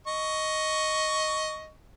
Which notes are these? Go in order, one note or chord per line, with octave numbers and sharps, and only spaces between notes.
D#5 C#6